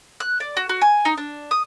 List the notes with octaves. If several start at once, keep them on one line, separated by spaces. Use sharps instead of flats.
F#6
D5
F#4
F#4
G#5
D#4
D4
D#6